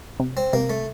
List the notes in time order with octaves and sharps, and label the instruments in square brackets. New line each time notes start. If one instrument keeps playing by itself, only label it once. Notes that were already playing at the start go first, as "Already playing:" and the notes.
[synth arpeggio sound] C3
[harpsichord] C4
[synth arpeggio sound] C3 [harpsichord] A#3
[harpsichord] A3